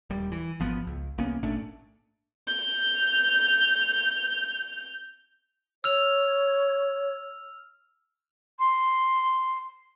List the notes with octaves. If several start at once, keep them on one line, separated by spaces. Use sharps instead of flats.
D#1 G3
E3
G#1 F3 B3
C#2
C2 A#3 B3 C#4
G#1 A#2 A3 D4
G6 F7
C#5 E6 F6 F7
C6